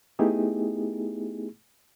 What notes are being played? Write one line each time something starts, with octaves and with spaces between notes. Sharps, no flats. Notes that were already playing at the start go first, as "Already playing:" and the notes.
A3 B3 D#4 E4 G4 G#4